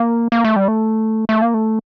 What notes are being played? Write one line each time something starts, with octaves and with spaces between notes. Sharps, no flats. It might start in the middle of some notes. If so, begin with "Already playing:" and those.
Already playing: A#3
A#3
A3
G3
A3
A3
A#3
A3